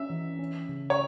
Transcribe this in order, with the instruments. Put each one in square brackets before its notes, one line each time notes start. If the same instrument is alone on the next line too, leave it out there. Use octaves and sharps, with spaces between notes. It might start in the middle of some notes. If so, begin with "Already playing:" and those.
Already playing: [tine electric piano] C#4 [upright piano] E5
[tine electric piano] E3
C#4
C#3
[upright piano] C#5